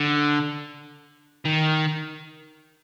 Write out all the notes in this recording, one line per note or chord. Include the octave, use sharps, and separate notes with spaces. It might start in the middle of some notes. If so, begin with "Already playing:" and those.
Already playing: D3
D#3